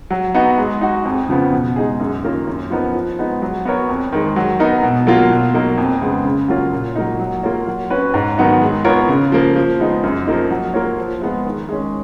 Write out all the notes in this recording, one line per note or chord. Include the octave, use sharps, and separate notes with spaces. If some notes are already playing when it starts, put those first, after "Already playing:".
F#3
B3 D#4 F#4
G#3
D#4 F#4
F2
C#3 F3 B3
B2
G#3 D#4 G#4
F#2
D#3 A#3 C#4 F4
F#2
F3 B3 D#4 A#4
F3
G#3 B3 D#4
F#3
B3 F#4 A#4 C#5
F2
D#3 G#3
F#3
B3 D#4 A#4
B2
F#3 A#3 F4
B2
F#3 A#3 D#4
F2
C#3 G#3 B3
C#3
F#3 A#3 C#4 F4
A#2
F#3 A#3 D#4
F#3
A#3 F4 A#4 C#5
F#3
C#4 F#4 B4
G#2
D#3 F#3 B3 D#4
G#3
B3 F4 A#4 C#5
C#3
F3 A#3
F3
G#3 B3 D#4
F#2
F3 A#3 D#4
F#3
A#3 F4 A#4 C#5
F3
G#3 B3 F4
D#3
G#3 C#4